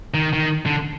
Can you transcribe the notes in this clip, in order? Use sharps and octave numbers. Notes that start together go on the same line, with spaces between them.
D#3
D#3
D3